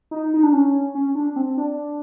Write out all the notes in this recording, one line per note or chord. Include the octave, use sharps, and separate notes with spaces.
D#4
D#4
D4
C#4
C#4
D4
C4
D4